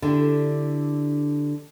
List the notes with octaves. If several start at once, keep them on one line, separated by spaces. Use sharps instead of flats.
D3 D4 E4 G4